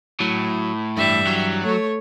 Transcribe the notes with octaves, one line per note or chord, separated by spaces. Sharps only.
A2 F#3
G2 E3 G3 E5
F#3
A3 C#5